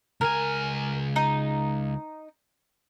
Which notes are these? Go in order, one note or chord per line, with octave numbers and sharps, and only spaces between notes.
C#2 A#4 G#5
D#4